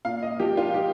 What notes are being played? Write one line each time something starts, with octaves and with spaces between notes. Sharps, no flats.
A#2 F5
D#5
F3 G4
F4
G4